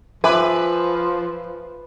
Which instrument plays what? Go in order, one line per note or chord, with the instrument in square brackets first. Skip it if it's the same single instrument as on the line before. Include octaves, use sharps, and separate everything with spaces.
[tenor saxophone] F3 [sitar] B4 [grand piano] E5 G#5 D6